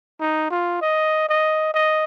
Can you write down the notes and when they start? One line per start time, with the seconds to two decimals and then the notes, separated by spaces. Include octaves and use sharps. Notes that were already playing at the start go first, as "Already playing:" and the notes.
0.20 D#4
0.51 F4
0.82 D#5
1.29 D#5
1.74 D#5